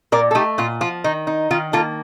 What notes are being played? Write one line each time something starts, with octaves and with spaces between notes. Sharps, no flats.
A#2 A#4 D5
A4
A3 D#4 G4
A#2 F4
F3 F4
D#3 D#4
D#4
D#3 F4
A#3 F4 A4